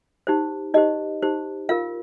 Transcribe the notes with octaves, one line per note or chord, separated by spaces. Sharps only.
D#4 G4 C5
D#4 G4 C5 D#5
D#4 G4 C5
F4 A#4 F5